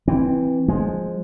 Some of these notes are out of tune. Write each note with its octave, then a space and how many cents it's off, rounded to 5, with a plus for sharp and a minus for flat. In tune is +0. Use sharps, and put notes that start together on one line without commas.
E3 +0 C4 +0
F3 +10 G#3 +0